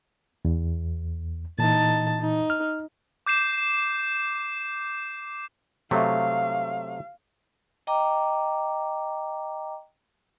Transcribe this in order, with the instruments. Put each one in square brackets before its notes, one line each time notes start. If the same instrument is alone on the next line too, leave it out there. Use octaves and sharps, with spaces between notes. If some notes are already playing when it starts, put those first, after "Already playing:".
[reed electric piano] E2
[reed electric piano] A#2 E3 [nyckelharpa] D#4 A5
[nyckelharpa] D#4
[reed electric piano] F6
[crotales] D6 G6 C7 E7
[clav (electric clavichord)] C3 F#3 A3 [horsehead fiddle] F5
[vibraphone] D#5 G5 A#5 D6